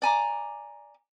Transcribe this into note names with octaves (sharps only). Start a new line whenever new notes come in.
D5 G#5 A#5 D6